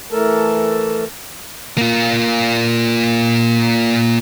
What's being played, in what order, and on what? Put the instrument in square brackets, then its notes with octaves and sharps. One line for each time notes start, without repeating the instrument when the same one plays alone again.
[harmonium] E3 A3 A4 A#4 A5
[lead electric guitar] A#3 F4